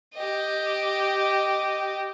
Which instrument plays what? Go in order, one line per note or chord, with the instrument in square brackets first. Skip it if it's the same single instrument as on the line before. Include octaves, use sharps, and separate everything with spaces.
[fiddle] G4 D#5